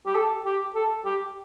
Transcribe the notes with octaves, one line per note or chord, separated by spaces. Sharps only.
G4
A4
G4
A4
G4